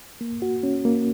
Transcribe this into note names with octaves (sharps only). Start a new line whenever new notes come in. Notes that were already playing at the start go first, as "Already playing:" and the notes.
A#3
F#4
C#4
A#3